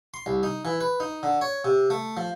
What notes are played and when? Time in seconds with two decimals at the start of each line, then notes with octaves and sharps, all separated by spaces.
0.14 C6
0.26 C2
0.43 D#4
0.65 E3
0.81 B4
1.00 D#4
1.23 D3
1.41 C#5
1.65 C3
1.90 A3
2.17 F3